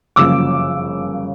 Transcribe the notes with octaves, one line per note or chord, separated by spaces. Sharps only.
G1 F#2 C#3 F3 A#3 D6 E6